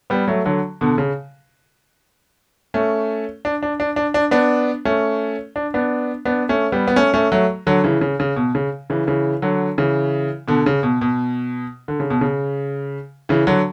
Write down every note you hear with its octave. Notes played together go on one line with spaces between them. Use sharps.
G3 B3
F#3 A3
D3 F#3
B2 D3
C#3
A3 C#4
D4
D4
D4
D4
D4
B3 D4
A3 C#4
D4
B3 D4
B3 D4
A3 C#4
G3 B3
B3
A3 C#4
A3 C#4
F#3 A3
D3 F#3
C#3 E3
C#3
C#3
B2
C#3
C#3 E3
C#3 E3
D3 F#3
C#3 E3
B2 D3
C#3
B2
B2
D3
C#3
B2
C#3
C#3 E3
D3 F#3